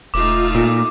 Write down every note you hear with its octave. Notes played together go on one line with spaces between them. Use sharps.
E1 A3 D#4 F4 D6
A#2